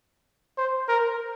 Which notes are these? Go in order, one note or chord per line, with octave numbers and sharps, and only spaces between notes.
C5
A#4